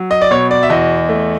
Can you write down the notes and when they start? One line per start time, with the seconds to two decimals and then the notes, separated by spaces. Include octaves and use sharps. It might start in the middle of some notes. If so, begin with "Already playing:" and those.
Already playing: F#3
0.11 D#5
0.22 D5
0.31 B2 C#5
0.51 D5
0.63 E5
0.70 E2 D#5
1.09 A3